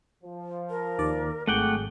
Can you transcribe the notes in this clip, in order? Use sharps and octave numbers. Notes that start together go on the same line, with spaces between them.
F3
A#4
D#2 D5
G#1 F#3 A3 G#4 F#5 G5 D6